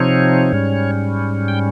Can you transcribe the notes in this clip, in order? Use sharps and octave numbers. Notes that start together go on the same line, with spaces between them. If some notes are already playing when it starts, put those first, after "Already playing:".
Already playing: C3 F3 C4 D#4 C#5
G#2 G3 C#4
G5